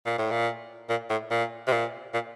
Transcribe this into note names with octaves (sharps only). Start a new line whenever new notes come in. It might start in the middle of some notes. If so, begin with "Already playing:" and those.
A#2
A2
A#2
A#2
A2
A#2
C3
A#2
A#2